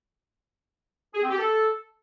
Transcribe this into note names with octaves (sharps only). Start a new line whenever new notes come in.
G#4
C4
G4
A4